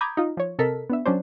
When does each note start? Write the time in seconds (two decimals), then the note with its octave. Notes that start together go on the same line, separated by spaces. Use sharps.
0.01 A#5 B5 D6 D#6 G6 G#6
0.17 D#4 F4
0.37 F3 C#5
0.59 C3 A4 A#4 D#5 B6
0.90 B3 D4 E5
1.06 F#3 C#4 D4 C5